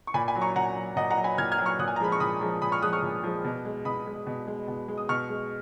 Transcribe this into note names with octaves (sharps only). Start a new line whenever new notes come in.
C#6
A#2 G#5 B5
G#5 B5
F#3
A#5 C#6
A#2 F#5 A#5
F#3
A#2 D#5 F#5
F#5 A#5
F#3
G#5 B5
A#2 F6 G#6
F6 G#6
F#3
C#6 F6
A#2 D#6 F#6
G#5
A#5
F3 G#3 B5
C#6
A#2 B5 D#6
F3 G#3
A#2 B5 D#6
C#6 F6
F3 G#3 D#6 F#6
C#6 F6
A#2
F3 G#3
B2
G#3
B2 B5 D#6
G#3
B2
G#3
B2
G#3
D#6
B2 C#6 F6
G#3